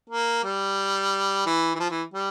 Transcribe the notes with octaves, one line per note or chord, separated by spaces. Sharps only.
A#3
G3
E3
E3
F3
E3
G3